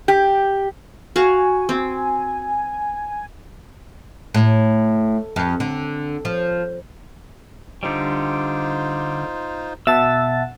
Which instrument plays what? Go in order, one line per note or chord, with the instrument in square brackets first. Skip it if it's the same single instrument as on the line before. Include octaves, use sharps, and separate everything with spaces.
[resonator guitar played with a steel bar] G4
[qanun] F#4 F5 C#6 [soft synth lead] G#5
[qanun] C4
[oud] A2
F2
D3
F3
[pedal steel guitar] D3 G3 [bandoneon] D#4 F4 C5
[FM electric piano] B2 F#5 A6 [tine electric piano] E5 A5 [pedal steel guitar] E6